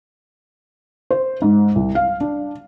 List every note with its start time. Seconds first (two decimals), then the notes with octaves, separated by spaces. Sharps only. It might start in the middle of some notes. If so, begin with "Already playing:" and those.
1.11 C5
1.42 G#2
1.76 C2
1.95 F5
2.21 D4